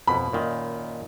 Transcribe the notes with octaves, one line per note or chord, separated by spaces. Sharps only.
F2 B2 B5
F#2 A#2 D#3